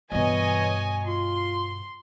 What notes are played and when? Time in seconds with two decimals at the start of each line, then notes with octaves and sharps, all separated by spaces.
0.12 G2 B2 E3 C#5 D#5 G#5
1.06 F4 C6